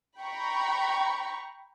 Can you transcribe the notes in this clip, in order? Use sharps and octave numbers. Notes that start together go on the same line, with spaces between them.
G5 A#5 B5 C#6